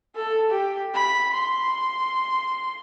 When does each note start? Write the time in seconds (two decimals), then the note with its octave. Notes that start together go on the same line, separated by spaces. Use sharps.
0.16 A4
0.50 G4
0.94 B5
1.35 C6